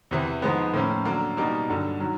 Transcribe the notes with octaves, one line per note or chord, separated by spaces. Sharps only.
E2 C3 E3
G#2 F3 G#3 B3
A2 F3 A#3 C#4
D3 F#3 A#3
B2 G3 A#3 D#4
G2 D3 F#3
D#3 F#3